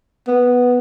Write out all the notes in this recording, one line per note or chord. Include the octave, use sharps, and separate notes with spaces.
B3